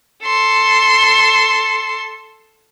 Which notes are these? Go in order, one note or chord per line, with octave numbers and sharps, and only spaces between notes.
A4 C6